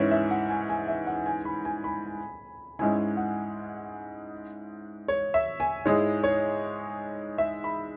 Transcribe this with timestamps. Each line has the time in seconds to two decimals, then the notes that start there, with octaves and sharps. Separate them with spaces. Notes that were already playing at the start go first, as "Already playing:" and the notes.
Already playing: G#2 E3 C#4 C#5 E5
0.11 E5
0.31 F#5
0.50 G#5
0.69 G#5
0.88 E5
1.07 F#5
1.26 G#5
1.45 B5
1.65 G#5
1.84 B5
2.79 G#2 G#3 C#4 E4 G#5
3.17 F#5
5.08 C#5
5.34 E5
5.60 G#5
5.85 G#2 G#3 E4 G#4 C#5
6.24 C#5
7.38 E5
7.64 B5